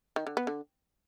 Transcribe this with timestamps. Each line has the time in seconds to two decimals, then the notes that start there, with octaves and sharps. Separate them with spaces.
0.16 D#3
0.27 D3
0.37 B3
0.47 D3